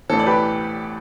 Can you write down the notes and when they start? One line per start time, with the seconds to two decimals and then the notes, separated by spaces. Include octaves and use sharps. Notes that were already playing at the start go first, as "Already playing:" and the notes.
0.10 A1 A2 E3 A4
0.19 D5
0.26 G4 B4